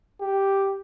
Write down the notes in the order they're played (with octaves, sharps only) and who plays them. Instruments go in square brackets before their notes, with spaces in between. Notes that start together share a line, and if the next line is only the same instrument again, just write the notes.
[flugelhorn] G4